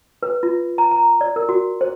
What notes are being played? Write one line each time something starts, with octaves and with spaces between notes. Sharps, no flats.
B4
F4
A#5
A#5
D5
A#4
F#4
C5